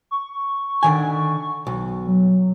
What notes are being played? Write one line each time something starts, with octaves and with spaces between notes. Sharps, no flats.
C#6
D3 D#3 G#5
B1
F#3